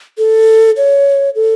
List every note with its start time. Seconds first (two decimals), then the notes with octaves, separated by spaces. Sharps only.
0.18 A4
0.77 C#5
1.35 A4